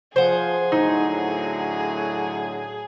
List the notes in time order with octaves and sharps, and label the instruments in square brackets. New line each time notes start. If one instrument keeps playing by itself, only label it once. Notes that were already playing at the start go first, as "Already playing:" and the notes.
[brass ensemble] F3 [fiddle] G#4 [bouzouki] C5 F#5
[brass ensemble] A2 D3 F#3 [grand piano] D#4